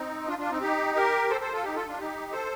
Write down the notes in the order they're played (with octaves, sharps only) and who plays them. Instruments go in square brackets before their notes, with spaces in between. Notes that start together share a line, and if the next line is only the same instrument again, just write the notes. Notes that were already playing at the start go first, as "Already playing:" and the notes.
Already playing: [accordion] C4 D#4
D4 F4
D4 F4
C4 D#4
D#4 G4
G4 A#4
A4 C5
A4 C5
F4 A4
D#4 G4
F4 A4
D4 F4
D#4 G4
A4 C5